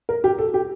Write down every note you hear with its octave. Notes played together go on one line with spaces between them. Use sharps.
A#4
G4
A4
G4